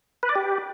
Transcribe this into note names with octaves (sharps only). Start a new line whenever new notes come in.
B4
D5
G4